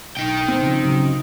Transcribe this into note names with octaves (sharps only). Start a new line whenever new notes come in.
B1 D#4 G5
C4
C#3 F3
C#3 F#3